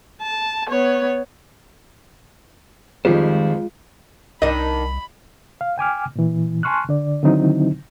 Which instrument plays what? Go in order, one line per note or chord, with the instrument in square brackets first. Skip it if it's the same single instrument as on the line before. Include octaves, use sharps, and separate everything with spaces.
[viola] A5
B3 C#5
[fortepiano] F2 G3 [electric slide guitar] D#3 G#4 C5 [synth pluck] G#3 F4
[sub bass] C2 [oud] D#3 D4 [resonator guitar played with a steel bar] D#5 [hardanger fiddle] B5
[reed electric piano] F5
G5 G#5 D6 F6
A#2 E3
G#5 A5 C6 C#6 F6 F#6
D3 D5
D3 D#3 F#3 C4 D#4 E4